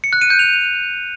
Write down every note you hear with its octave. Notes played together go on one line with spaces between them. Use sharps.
C#7
F#6
D#7
G6
F7